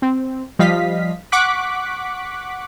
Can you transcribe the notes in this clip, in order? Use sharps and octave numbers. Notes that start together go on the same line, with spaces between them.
C4
F3 G3 D#5 F5 B6
F#5 C#6 D6 F#6 B6